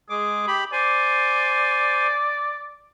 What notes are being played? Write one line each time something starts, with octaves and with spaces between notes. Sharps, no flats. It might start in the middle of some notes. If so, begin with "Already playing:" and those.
G#3 G#4 D6
G4 B5
C5 D5 G#5